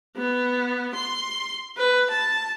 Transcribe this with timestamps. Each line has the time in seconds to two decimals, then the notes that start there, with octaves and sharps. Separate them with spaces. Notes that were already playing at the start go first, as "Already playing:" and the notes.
0.17 B3
0.95 C6
1.77 B4
2.10 A5